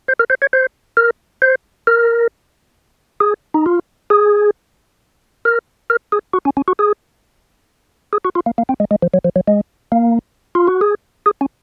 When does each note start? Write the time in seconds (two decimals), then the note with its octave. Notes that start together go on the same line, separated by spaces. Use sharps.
0.08 C5
0.19 A#4
0.30 C5
0.42 C#5
0.53 C5
0.97 A#4
1.42 C5
1.87 A#4
3.20 G#4
3.54 D#4
3.66 F4
4.10 G#4
5.45 A#4
5.90 A#4
6.12 G#4
6.33 F#4
6.45 C#4
6.57 C#4
6.68 F#4
6.79 G#4
8.13 G#4
8.25 F#4
8.35 F4
8.46 A#3
8.58 A#3
8.69 C4
8.80 G#3
8.91 G#3
9.02 F3
9.14 F#3
9.24 F3
9.36 F#3
9.48 G#3
9.92 A#3
10.55 F4
10.67 F#4
10.81 G#4
11.26 G#4
11.41 C#4